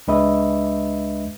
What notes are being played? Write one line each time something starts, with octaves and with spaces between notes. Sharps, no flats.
C#2 G#3 D4 B4 D#5 E5